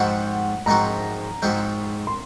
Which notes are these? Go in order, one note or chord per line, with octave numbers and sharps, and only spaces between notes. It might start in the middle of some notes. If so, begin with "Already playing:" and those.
Already playing: G#2 F3 C4 F#4 C5 F#5
G#2 F3 C4 F#4 C5 A#5
G#2 F3 C4 F#4 C5
C6